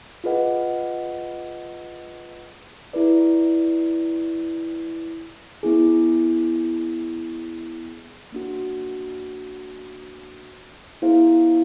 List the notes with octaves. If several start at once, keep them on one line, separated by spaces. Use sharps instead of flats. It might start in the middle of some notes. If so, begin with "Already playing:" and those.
F4 G#4 B4 D#5 F#5
E4 G#4 B4 D5
B3 E4 G#4
A#3 D4 F#4
B3 E4 G#4 C5 F5